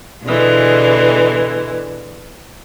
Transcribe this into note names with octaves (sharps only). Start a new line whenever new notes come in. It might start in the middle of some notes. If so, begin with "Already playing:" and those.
B2 D3 E3 G#3